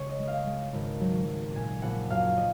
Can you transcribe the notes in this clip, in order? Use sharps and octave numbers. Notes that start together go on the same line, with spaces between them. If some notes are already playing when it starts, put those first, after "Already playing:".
Already playing: C#2 C#3 C#5
D#5
G#3
F5
G#3
G#1
F#3
F#3
A#2 G#5
A#1 F#5
F#2 F5
D#5